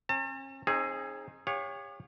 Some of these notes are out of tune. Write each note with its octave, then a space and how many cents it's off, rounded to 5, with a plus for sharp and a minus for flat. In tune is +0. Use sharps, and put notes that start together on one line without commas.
C#4 -45 A5 +40
C4 +40 D#4 +0 G#4 +5
G4 +45 C#5 +0 F5 +40